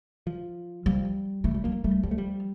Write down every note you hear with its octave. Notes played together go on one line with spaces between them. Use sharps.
F3
F3 G3
E3 A3
G3
F3 A#3
G3 A3
F3 G3
A3
G3